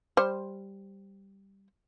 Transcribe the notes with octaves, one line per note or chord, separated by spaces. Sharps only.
G3 C5